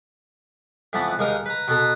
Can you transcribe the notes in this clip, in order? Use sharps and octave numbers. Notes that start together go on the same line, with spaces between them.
F2 E3 B3 F#5 A5 B5
D#2 G#3 D#4 A#4 F5 D#6
B4 A#5
B2 B3 A4 A#5